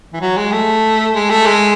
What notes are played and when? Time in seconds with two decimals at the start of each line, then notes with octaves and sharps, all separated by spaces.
0.13 E3
0.21 F#3
0.37 G#3
0.52 A3
1.14 G#3
1.30 A3
1.46 G#3